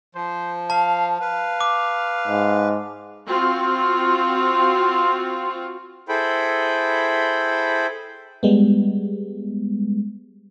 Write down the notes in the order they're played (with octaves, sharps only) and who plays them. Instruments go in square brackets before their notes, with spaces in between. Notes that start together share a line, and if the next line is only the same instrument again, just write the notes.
[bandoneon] F3 [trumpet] C5
[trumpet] F5 [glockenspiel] A5
[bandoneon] B4 [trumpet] F5
[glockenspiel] D6
[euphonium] G#2
[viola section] C4 F4 F#4
[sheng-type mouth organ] E4 G#4 A4 C5 G5 B5
[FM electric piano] G3 G#3 B3